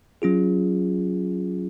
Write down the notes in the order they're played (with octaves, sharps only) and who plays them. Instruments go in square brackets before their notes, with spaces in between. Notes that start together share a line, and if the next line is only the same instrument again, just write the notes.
[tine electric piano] F#3 C#4 F4 G#4